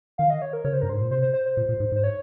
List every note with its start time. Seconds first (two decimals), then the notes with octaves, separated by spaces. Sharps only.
0.18 D#3 F5
0.30 D#5
0.42 C#5
0.53 A#4
0.65 C#3 C#5
0.73 C5
0.82 G2 A#4
0.90 G#2 C5
1.01 A#2
1.11 C3 C5
1.22 C5
1.33 C5
1.46 C5
1.57 A#2
1.69 A#2
1.80 G#2
1.92 G#2 C5
2.04 C#5